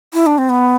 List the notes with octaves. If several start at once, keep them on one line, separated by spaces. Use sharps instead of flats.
E4
D4
C4
B3